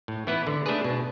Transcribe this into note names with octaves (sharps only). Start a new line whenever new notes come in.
A2
E3 B3 E4 B4
D3
A3 D4 G#4 B4
B2